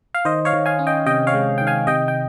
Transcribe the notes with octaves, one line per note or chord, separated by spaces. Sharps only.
F5
D#3 C5 D#5
C#5 F5
D#3
F5 G#5
C#4
D#5 G5
C3 D#5 G5
C#5 F5
G#3
D#3 G5
F5 G#5
C3 D#5 G5
G5